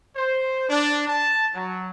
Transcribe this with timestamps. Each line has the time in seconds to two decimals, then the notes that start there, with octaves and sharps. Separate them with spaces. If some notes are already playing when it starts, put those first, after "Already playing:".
0.16 C5
0.69 D4
1.07 A5
1.55 F#3